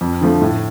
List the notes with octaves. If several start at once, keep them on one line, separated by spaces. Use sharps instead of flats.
F2
D3 F3 A3
A2